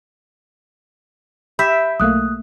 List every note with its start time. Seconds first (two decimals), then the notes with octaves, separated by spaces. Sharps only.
1.59 G4 E5 B5 G6 B6 D7
2.00 B1 A3 A#3 D#6 F#6